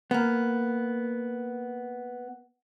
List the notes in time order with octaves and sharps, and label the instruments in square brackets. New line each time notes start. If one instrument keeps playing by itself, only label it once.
[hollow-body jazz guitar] A#3 B3